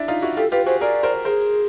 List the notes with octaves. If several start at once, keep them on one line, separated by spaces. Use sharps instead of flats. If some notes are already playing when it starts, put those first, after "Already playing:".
Already playing: D4 E4
D#4 F4
E4 F#4
F4 G4 A4
F4 G4 B4
F#4 G#4 C5
G#4 A#4 D5
A#4 C5
G#4 A#4 C5